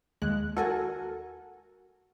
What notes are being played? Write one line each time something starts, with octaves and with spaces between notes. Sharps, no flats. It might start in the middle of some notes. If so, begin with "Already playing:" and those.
D#2 G#3 F#6
F#4 A4 A#4 G#5